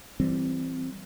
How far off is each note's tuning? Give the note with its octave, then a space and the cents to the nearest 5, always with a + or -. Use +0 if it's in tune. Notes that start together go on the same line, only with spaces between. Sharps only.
E3 +10 G3 -10 C4 +0